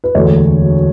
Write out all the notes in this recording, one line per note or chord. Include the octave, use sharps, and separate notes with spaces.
B4
E1 D2 D3 C#5